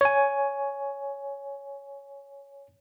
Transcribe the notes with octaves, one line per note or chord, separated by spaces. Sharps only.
C#5 G#5